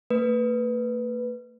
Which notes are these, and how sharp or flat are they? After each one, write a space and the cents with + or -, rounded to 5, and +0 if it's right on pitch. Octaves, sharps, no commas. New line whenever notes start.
A3 +45 B4 +0